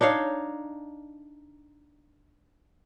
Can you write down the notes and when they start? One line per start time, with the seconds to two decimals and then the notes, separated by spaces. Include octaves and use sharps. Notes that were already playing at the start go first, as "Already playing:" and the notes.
0.01 D4 D#4 C#5 F5